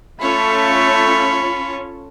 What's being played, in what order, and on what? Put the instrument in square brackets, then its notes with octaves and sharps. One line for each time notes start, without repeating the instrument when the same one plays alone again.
[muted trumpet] A3 [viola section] C#4 F4 [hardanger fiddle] A4 C#5 [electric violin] B5